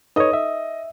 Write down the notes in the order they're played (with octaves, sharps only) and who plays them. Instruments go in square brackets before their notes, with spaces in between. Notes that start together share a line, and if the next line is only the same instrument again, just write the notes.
[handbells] D#4 A4 [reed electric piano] B4 C#5 [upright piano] D#5 D#6
[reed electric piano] E5